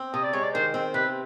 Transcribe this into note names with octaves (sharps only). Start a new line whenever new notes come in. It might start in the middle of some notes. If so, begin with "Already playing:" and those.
Already playing: C4
C3 D#5
D5
G#3 C#5
D5
D#3 C5
C4
C3 B4